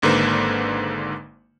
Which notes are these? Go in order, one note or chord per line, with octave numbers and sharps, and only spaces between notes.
G#1 G#2 D3 A#3 B4 C5